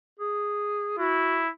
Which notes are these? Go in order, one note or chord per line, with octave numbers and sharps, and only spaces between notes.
G#4
E4 F#4